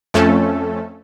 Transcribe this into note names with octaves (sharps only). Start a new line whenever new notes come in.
F2 A3 C#4 A4